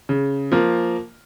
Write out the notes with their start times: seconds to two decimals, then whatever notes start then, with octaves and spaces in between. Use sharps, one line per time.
0.09 C#3
0.52 F3 A#3